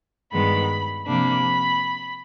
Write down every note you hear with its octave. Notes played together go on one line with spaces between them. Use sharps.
G2 D#3 G#3 B3 B5
C3 F3 A#3 D4 B5